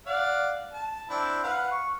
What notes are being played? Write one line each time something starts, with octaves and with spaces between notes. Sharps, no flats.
D5 F5 F#5
A5
C4 D4 E4
B4 F5 F#5
C#6